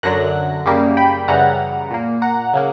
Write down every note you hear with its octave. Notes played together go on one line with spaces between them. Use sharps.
F#2 D3 F#3 F#6 A#6
F#2 C#3 G3 A#3
G5 B5
F#2 C#3 E3 G3 F#5 A#5
A#2 A#3
F#5 A#5
C#3 F#3 A#3